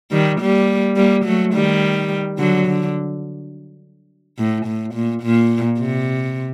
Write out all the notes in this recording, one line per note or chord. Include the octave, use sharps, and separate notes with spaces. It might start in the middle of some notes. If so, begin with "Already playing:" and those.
D#3 G3
G3 A#3
G3 A#3
F#3 A3
D#3 G3
D3 F#3
D3
A2
A2
A#2
A#2
C3